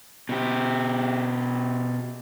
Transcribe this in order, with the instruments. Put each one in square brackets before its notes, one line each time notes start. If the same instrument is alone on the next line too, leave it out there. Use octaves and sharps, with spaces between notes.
[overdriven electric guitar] B2 G4